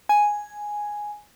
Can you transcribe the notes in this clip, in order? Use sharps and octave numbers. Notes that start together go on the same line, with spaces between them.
G#5